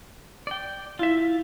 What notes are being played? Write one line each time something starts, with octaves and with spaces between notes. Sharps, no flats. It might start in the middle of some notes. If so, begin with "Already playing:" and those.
D5 G5
E4 F4 E5
F4